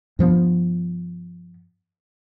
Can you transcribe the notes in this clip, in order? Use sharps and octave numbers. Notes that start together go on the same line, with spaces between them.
G2 F3 B3